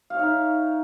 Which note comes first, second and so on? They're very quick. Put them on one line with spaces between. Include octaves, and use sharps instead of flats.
F5 C#5 D#4 E5